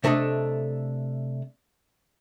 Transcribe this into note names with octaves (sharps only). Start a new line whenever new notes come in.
C3 A3 D4 A4 D#5